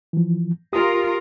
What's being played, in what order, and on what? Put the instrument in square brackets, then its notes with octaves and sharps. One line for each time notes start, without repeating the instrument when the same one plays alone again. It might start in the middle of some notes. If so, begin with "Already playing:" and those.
[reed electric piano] E3 F3
[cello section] F4 A#4 [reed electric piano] G4 D#6